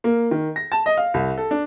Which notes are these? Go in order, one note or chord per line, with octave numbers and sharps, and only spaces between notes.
A#3
D#3
A#6
A5
D#5
F5
C2
A4
D4